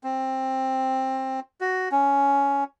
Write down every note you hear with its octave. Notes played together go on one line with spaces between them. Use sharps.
C4
F#4
C#4